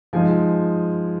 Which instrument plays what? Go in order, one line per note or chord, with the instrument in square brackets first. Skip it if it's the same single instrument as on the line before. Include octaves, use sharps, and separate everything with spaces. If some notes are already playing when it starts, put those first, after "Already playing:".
[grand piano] F3 G#3 D#4 G#5